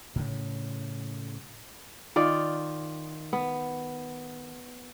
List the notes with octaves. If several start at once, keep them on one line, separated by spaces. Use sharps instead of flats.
A2 C#3
D#3 F4 D5
B3